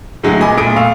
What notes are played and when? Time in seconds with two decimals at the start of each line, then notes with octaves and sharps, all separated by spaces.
0.23 A2 D3 F#3 G#3 F#4
0.40 E1 A#2 D#5 G#5 B5 D6
0.57 E1 A#2 A3 B5 D#6 D7
0.76 F5 C#6 E6